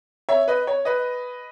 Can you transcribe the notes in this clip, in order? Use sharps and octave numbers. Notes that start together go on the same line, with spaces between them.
C#5 E5
B4 D#5
C#5
B4 D#5